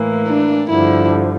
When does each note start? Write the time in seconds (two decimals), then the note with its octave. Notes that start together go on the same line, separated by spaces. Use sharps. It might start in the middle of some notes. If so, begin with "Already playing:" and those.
Already playing: A2 E3 A#3
0.27 D4
0.70 G2 D3 F3 E4